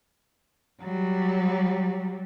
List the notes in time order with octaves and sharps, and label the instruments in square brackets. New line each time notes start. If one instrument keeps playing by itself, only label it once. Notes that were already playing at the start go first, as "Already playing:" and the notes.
[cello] F#3 G3